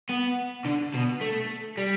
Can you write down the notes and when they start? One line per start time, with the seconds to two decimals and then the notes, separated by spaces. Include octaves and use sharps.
0.10 B3
0.66 D3
0.94 B2
1.21 A3
1.77 G3